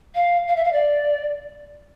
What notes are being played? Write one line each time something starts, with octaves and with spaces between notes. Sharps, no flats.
F5
F5
E5
F5
D5